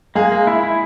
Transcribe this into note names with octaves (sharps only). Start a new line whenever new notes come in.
G#3 A#3 G#4
A#3
E4
E4